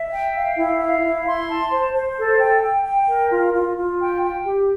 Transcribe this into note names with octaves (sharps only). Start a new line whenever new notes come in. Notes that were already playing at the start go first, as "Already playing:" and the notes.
Already playing: E5
G5
F5
E4
F5
E4
C6
A5
C5
C5
A4
G5
G5
G5
A#4
F4
F4
F4
G5
G5
G4